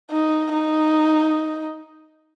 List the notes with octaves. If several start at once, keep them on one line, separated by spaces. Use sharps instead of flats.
D#4
D#4